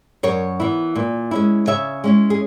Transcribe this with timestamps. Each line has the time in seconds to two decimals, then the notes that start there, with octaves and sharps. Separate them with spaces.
0.23 F#2 A#4 C#5
0.60 E3 B3 E4
0.95 A#2
1.31 G#3 C#4 E4
1.67 C#3 C#5 E5
2.04 G#3 C#4 E4
2.30 G#4